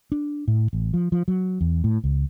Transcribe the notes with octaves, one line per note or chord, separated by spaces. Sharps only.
D4
A2
A1
F3
F3
F#3
E2
A2
C#2